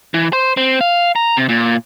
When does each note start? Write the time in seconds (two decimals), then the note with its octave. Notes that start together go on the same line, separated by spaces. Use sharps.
0.14 E3
0.33 C5
0.57 C4
0.81 F5
1.16 A#5
1.37 C3
1.49 A#2